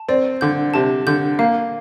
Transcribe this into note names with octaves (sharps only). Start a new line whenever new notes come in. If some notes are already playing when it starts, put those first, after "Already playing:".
Already playing: A5
C4 D5
D3 G6
C3 A5
D3 G6
A#3 F5